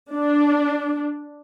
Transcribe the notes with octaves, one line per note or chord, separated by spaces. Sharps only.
D4